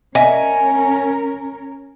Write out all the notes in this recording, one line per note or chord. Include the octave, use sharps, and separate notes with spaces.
C#4 A#4 D#5 E5 G#5